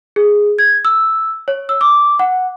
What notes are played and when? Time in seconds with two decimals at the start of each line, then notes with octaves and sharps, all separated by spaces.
0.16 G#4
0.59 G#6
0.85 E6
1.48 C#5
1.69 E6
1.81 D6
2.19 F#5